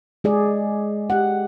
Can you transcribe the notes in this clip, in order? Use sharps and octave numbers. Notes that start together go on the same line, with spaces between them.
G#3 G#4 D5
G4 F#5